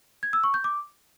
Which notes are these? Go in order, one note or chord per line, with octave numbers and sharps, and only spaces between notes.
G#6
E6
C#6
G6
D6